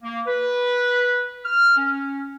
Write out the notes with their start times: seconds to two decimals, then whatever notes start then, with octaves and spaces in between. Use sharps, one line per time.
0.02 A#3
0.27 B4
1.45 F6
1.77 C#4